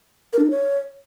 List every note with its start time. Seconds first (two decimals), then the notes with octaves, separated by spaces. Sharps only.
0.33 A#4
0.39 D4
0.45 D#4
0.50 C#5